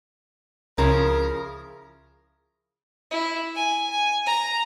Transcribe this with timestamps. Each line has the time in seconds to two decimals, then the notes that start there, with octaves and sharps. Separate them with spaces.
0.78 C#2 C#3 F3 E4 A#4
3.11 E4
3.56 G#5
3.91 G#5
4.26 A#5